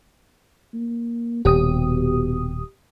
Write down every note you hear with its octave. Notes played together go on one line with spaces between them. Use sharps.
A#3
D#1 B2 G4 D#6